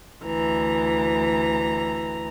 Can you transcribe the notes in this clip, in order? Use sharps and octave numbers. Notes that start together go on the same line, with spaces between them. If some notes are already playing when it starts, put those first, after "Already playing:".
D2 E3 A#5